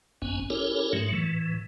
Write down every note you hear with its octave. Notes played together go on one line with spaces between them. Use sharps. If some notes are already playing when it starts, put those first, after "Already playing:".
G#1 F#2 B3 C#4 G#5
C#4 E4 G4 A4 A#4 C#5
G#2 F#3 A3
A2 E3